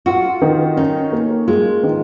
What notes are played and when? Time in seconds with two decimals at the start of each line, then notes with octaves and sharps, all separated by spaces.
0.06 F4 F#4
0.42 D#3
0.77 C#4 D#4
1.12 A#3
1.48 G#3 F4
1.83 D#3